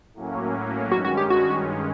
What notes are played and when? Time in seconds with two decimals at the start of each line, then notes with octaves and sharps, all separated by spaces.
0.14 A2 F#3 A#3 C#4
0.92 G2 D#3 G#3 C#4 F#4
1.05 F#4
1.17 G4
1.30 F#4